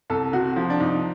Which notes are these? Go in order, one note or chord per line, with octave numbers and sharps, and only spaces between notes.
C2 A4
C3 F#4
F3
D4
C2 D#4